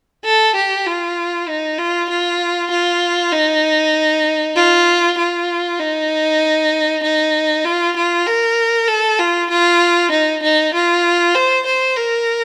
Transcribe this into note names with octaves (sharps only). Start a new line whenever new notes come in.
A4
G4
F4
D#4
F4
F4
F4
D#4
F4
F4
D#4
D#4
F4
F4
A#4
A4
F4
F4
D#4
D#4
F4
C5
C5
A#4